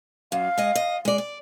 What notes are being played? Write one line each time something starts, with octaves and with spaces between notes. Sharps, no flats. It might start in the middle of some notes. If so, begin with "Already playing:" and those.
F#2 F5
G#3 D#5
D#5
G#3 D5
D5